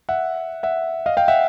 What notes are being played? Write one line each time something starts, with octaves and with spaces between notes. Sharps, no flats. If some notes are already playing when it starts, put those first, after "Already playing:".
E5 F#5
E5 F#5
D#5 F5
F5 G5
E5 F#5